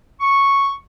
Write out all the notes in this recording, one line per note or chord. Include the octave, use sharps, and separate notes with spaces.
C#6